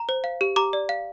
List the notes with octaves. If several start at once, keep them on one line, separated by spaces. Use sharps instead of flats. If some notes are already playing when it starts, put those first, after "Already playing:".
Already playing: A#5
C5
F5
G4
G4 A#5 D6
D5
F5